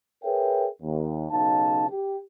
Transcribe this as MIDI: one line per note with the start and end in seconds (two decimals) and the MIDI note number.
0.24 0.68 68
0.24 0.68 70
0.24 0.68 71
0.24 0.68 73
0.24 0.68 76
0.24 0.68 79
0.81 1.27 39
1.31 1.86 35
1.31 1.86 49
1.31 1.86 63
1.31 1.86 77
1.31 1.86 81
1.90 2.19 67